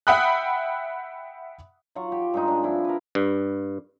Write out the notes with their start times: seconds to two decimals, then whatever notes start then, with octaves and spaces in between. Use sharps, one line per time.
0.07 E5 F#5 G5 B5 D#6 F#6
1.95 F#3 F4 F#5 C#6
2.12 G4
2.34 G2 G#3 D#4
2.48 D4
2.63 F3 C4 D4 E4
2.85 A#4 B4
3.15 G2